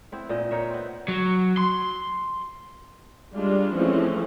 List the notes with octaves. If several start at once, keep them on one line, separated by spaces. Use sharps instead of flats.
B3 C4 E4
A#2 C5 D#5
D#4 A#4 C#5 E5
B3 C4
F#3
C6
G3 G#3 D4 F4
E3 F3 G#3 A3 C4 C#4